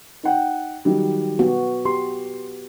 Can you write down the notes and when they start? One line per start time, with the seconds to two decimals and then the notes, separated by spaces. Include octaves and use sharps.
0.23 D#4 F#5 G5
0.85 D#3 F#3 G3
1.39 B3 F#4
1.85 G4 C6